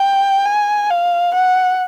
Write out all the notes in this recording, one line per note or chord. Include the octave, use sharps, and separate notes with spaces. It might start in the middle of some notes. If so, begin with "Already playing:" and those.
Already playing: G5
G#5
F5
F#5